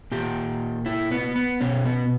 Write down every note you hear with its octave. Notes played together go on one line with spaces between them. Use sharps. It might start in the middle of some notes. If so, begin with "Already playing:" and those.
A#2 G4
E4
B3
B3
B2 C#4
B3